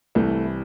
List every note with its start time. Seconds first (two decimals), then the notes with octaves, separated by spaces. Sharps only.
0.15 C2 C3 E3 A3